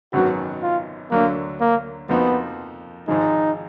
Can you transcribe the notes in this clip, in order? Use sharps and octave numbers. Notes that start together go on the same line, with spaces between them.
G#1 F#2 D#3 F#3 B3 F#4
F4
D2 D3 F#3 A#3
A#3
F2 F3 A#3 B3 D#4 F#4
G#1 G#2 F3 G#3 D#4